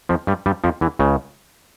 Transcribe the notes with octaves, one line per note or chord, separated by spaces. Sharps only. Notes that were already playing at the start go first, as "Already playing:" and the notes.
F2 F3
G2 G3
G2 G3
F2 F3
E2 E3
C#2 C#3